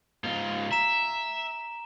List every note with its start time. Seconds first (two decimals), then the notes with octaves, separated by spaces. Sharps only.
0.24 G#2 F4
0.72 E5 A#5 E7